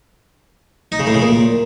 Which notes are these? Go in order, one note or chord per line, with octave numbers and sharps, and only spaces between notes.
D#4
C#3
A2
C#3
A#2